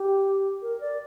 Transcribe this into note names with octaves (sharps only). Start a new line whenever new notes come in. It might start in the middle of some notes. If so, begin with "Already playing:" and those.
Already playing: G4
A#4
D5